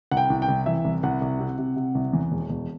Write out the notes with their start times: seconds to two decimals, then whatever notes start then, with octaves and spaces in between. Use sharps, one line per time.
0.11 C2 F#5
0.17 G5
0.30 C2
0.42 G5
0.48 C2
0.66 E3 E5
0.84 C2
1.03 C2 F#5
1.21 C2
1.40 C3
1.58 C3
1.76 C3
1.95 C2
2.13 E2
2.31 E1
2.49 E1